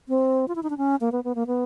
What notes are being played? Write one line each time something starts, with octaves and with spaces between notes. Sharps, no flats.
C4
F4
E4
D#4
D4
C#4
A#3
B3
B3
A#3
B3